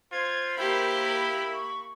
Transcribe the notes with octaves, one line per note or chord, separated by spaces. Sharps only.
F4 C5 G#6
A#3 E4 G4 A#4 B5
C#6